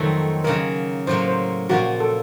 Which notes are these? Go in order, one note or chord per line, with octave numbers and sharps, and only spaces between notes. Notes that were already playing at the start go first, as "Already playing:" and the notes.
Already playing: F2 D#3 F#3 A3 C4 A4
C#3 F#3 A#3 A#4
A2 F#3 A#3 C5
C5
A#2 F3 A#3 F#4
A4